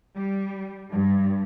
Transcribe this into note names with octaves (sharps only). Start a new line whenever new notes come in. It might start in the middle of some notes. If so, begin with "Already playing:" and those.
G3
G2